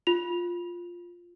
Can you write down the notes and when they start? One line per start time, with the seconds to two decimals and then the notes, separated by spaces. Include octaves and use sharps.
0.07 F4 F7